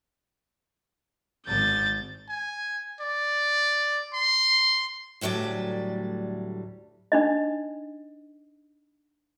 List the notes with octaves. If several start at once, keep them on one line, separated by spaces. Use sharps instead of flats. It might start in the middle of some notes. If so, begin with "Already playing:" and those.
G#1 G6 A6
G#5
D5
C6
D2 A2 F#3 G3 D5
D4 D#4 D#5